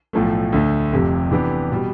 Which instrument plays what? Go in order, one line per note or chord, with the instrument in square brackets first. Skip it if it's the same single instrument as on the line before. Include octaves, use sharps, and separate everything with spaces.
[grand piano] B1 A2 F3 A3
D2 D3 A3
F1 F2 C3 F3
C3 E3 B3 D4 G4
B2 G3